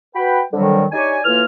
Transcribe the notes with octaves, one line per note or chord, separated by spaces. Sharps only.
F#4 B4 G5 B5
F2 D3 D#3 F#3 G3
D4 D#4 G4 C#5 D5 G#5
A2 E3 A#3 F4 G#5 F6